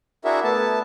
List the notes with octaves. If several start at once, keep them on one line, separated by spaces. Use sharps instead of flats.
D4 E4 F#4 G#4 A#4 E5
A3 B3 A5